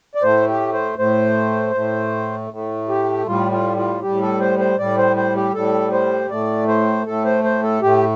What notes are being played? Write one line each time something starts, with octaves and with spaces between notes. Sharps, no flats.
D5
A2 A3 C5
G4
C5
A2 A3 C5
A2 A3
A2 A3
G4
A2 G3 F4
F4
F4
A2 G3 G4
A4
C5
C5
A2 G3 D5
C5
C5
G4
A2 G3 A4
C5
A2 A3 D5
C5
A2 A3 A4
C5
C5
A4
A2 A3 G4